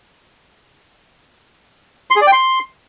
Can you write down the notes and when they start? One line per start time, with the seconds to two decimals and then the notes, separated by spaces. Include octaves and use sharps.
2.11 C6
2.16 G#4
2.21 D5
2.27 G5
2.32 C6